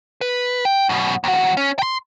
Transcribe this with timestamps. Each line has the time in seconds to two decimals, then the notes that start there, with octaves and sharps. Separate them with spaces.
0.21 B4
0.65 G5
0.89 F#2 B2
1.24 D#2 F#4
1.57 C#4
1.79 G5 C6